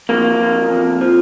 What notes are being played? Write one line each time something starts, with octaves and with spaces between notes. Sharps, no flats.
F2 A#3
F2
F2
F3